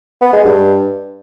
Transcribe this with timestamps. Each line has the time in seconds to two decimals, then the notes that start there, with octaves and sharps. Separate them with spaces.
0.22 B3
0.33 G#3
0.45 G2